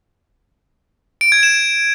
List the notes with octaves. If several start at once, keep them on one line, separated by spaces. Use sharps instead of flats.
D7
G#6
E7